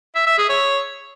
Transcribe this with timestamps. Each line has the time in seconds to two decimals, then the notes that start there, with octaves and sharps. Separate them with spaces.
0.15 E5
0.27 E5
0.38 G#4
0.49 C#5